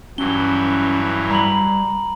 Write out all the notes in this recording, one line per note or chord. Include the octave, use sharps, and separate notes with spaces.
G2 E3 F#3 C#4 G7
G3 A#5 B5 F#7